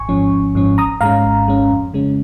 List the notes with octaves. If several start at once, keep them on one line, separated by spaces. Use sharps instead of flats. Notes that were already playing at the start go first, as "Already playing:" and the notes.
Already playing: G#1 G#5 C#6
G#2 F3 C#4
G#1
G#2 F3 C#4
G#1 A#5 D#6
G#2 G#3 C#4 F5 A#5
G#1
G#2 G#3 C#4
F2
C#3 G#3 C#4